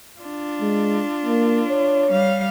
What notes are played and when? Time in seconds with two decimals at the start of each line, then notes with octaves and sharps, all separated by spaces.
0.20 D4 F4
0.61 G#3
1.26 A#3
1.70 C#5
2.12 G3 F5